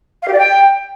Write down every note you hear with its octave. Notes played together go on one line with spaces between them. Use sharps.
F5
G4
D5
G5